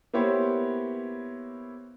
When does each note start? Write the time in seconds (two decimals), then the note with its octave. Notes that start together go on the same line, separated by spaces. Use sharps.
0.14 A#3 B3 E4 G4 C5 C#5